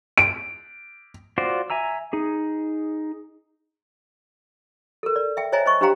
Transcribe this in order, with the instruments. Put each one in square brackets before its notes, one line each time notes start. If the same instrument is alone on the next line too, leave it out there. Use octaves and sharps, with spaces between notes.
[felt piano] D7
[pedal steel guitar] F4 F#4 C5 D5
E5 G#5 A#5 E6
D#4 G#4
[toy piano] A4 A#4
D5
E5 G5
C5 C#5 D#5 E5 G#5 A#5
C5 D#5 C#6
D4 G4 C5 F5 G5 A#5